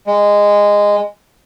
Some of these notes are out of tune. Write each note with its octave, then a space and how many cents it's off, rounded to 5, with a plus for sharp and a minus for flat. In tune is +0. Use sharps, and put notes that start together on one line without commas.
G#3 -15